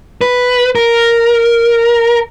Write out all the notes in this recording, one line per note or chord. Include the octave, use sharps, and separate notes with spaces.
B4
A#4